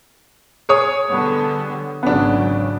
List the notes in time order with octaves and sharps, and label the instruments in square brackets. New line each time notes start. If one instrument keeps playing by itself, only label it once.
[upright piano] G#4 C#5 D#6
[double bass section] D3 G3 B3
[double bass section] G#1 C#3 F#3 [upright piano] B3 D4